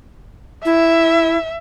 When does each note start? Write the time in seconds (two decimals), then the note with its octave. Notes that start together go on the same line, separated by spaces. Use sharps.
0.65 E4 E5